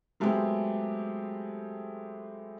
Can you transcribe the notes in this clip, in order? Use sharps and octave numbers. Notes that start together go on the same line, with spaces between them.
F#3 G#3 A3 B3 C4 G4